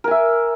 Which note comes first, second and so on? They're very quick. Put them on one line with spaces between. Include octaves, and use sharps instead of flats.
A#4 G#5 E5